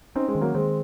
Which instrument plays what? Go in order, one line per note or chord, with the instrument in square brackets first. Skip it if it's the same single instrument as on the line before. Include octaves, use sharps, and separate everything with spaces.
[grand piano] C4 D#4 [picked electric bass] C#4
[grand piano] G#3 C4
[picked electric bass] D#3
[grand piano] F#3 A#3
[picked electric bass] D#3 [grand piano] G#3 C4